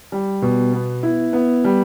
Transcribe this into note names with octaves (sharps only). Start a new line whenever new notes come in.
G3
B2
B3
E4
B3
G3